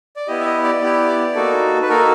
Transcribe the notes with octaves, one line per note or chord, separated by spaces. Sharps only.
D5
B3 E4 G4 D#5
E5
D#5
D5
B3 E4 G4
A#3 D#4 F#4 A4
B4
A#3 D#4 F#4 A4 A#4